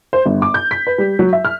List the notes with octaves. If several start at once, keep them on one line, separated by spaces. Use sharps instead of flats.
C5
G1
D6
G6
B6
B4
G3
F#3
E5
F6